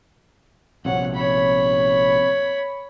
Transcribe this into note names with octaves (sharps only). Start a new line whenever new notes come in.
A#1 C3 C#5 F#5
C#5 B5